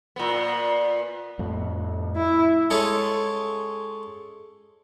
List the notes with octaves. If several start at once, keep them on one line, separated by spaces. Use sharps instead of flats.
A#2 B3
F2 A2
E4
G#3 C#4 F4 A4 C#5 D#5